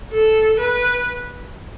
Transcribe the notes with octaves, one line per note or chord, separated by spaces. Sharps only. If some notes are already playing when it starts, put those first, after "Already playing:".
A4
B4